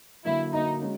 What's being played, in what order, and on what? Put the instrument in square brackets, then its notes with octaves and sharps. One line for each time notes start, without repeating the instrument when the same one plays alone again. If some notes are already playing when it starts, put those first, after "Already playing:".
[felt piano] D3 F#3 A#3 [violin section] E4
[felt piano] D3 F#3 A#3 [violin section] D#4
[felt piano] G#3 C#4 F#4